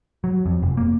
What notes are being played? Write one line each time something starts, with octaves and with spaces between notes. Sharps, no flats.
F#3
F2
F1
A#3